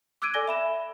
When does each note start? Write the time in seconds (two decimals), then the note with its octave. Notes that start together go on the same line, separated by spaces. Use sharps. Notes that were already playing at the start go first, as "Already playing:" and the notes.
0.22 D6 E6 F#6 G#6 D7 D#7
0.34 A4 D5 G#5 A#6 G7
0.48 E5 B5 E7